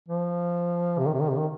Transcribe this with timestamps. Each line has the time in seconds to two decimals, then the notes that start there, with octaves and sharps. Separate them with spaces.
0.08 F3
0.98 C3
1.06 D#3
1.14 C3
1.22 D#3
1.30 C3
1.38 D#3